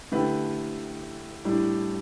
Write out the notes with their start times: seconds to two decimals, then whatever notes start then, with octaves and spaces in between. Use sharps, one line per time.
0.12 D3 A3 E4 G4 B4
1.45 A2 G3 D4